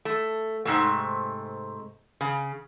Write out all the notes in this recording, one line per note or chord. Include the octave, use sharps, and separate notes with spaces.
A3
G#2 C3 A3
C#3